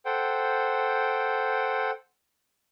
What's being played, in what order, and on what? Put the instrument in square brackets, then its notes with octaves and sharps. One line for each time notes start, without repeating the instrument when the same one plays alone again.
[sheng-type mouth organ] A4 C5 F#5 G5